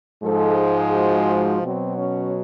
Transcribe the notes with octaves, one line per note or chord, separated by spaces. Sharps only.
G#2 F3 G#3 A4
G#4
F#4
B2 F#3 C4
C#4